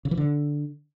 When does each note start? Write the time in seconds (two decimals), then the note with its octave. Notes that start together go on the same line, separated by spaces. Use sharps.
0.05 C#3
0.11 E3
0.17 D3